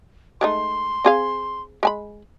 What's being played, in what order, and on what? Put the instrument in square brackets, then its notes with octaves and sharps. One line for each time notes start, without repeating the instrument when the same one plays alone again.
[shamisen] G#3 A3 D#4 [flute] C6
[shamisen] C4 G#4 F5
G#3 G#5 B5